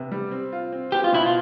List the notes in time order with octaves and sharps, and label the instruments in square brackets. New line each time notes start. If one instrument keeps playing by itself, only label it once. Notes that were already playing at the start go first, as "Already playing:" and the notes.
Already playing: [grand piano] C3 B3
G3
C4
F4
C4
[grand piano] B3 [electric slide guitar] G4
[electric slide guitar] F4
[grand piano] B2 [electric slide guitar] E4
[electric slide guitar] F4